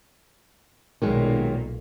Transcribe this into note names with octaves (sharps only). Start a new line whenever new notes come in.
B1 A#2 D#3 F#3 G#3